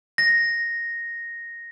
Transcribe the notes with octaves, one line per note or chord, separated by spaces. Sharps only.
A#6